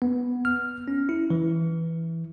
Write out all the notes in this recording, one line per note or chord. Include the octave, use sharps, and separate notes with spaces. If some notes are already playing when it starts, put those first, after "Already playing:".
B3
F6
C#4
E4
E3